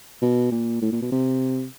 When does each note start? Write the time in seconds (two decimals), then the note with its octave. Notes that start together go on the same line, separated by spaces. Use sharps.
0.22 B2
0.52 A#2
0.82 A2
0.92 A#2
1.02 B2
1.12 C3